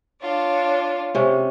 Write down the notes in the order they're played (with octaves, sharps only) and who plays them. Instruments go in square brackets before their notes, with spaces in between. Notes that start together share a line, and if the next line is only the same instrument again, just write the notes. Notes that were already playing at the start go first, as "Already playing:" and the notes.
[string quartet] D4 F4 C#5
[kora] C3 C#4